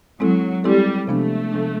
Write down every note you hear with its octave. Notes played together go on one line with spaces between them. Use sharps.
F#3 G#3 C4 E4 A4
G3 G#3 C4 E4 A4
C3 F3 G#3 A3 B3 D4
C3 F3 G#3 B3 D4